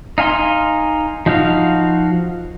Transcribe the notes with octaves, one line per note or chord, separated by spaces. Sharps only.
D#4 F5 G#5 C6
F3 D#4 F#4 F5